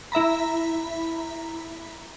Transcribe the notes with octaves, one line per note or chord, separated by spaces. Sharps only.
E4 E5 A#5 B5